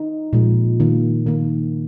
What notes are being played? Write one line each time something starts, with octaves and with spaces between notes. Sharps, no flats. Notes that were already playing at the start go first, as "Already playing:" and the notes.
Already playing: D#4
A#2 F3 G#3
D#3 A#3
D#3 A#3